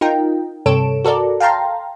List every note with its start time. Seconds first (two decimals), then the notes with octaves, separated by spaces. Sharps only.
0.01 D#4 F4 A#4 G5
0.66 G2 C3 A4 C#5 D7 E7
1.05 F#4 A4 A#4 D5
1.40 F5 G5 A5 A#5 C6